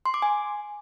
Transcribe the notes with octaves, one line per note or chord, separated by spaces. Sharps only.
C6
D6
G#5